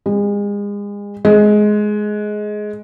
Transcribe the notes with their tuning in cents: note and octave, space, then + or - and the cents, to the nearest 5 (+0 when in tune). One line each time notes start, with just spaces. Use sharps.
G#3 -35
G#3 +15